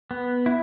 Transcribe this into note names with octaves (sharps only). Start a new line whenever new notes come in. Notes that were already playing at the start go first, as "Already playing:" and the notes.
B3
E4